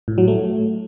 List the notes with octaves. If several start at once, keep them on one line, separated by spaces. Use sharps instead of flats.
A2
F#3
A3